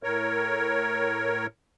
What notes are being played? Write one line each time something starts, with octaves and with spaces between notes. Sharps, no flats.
A2 A#4 C#5